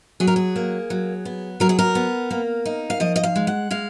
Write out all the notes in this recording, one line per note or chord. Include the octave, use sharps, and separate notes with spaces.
F#3 G#4
A#4
G#4
A#3
F#3
B3
F#3 A#4
G#4
A#4
B3
A#3
D#4
F5
F3 D#5
D#5
F5
G#3
F#5
G#3 F5